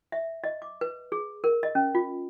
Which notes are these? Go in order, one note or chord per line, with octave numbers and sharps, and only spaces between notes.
E5
D#5
D6
B4
G#4
A#4
D#5
C#4
F4